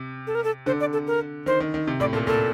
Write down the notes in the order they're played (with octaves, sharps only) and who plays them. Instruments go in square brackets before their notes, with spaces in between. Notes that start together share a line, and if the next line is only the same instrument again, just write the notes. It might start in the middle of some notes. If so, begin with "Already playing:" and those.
Already playing: [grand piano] C3
[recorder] A4
A#4
A4
[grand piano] D3 [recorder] C5
[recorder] D5
A4
A#4
[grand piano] D#3 [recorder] C5
[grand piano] D#3
D#3
C3
[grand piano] A2 [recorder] D5
[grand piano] A#2 [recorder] A4
[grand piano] A#2 [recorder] A4